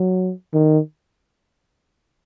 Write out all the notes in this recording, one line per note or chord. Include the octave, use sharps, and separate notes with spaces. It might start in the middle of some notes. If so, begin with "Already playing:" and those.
Already playing: F#3
D#3